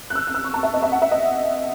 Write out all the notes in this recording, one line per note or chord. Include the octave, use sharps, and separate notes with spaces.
F#6
E6
F#6
E6
C#6
A5
E5
D#5
E5
F#5
E5
D#5